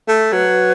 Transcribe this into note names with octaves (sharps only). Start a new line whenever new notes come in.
A3 A4
F#3 B4